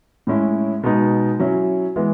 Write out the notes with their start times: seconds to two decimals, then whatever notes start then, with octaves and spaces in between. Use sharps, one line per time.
0.27 A2 G#3 C#4 E4
0.83 B2 G#3 B3 D#4
1.39 F#3 C#4 E4
1.96 E3 G#3 B3